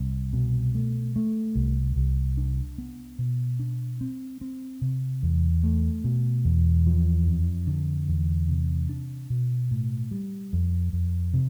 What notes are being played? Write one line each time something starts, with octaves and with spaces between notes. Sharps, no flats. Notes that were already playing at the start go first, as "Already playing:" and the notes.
Already playing: C2
B2
A3
A3
C2
C2
D4
B3
B2
D4
C4
C4
C3
E2
A3
B2
E2
F3
F2
D3
E2
C3
D4
B2
A2
G3
F2
F2
C3